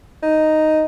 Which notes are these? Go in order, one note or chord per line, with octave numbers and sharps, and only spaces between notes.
D#4